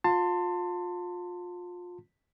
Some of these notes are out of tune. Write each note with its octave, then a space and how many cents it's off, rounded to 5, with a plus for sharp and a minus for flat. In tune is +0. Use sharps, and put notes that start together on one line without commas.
F4 +25 A5 +25 C6 +0